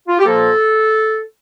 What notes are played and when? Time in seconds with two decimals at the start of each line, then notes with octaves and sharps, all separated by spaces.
0.08 F4
0.19 G4
0.26 A#2 F3 A#3 A4